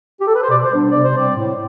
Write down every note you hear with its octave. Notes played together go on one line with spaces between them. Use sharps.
G4
A4
B4
C5
B2 D5
C5
G3 B3 D4
C3 D5
C5
G3 C4 D5
A2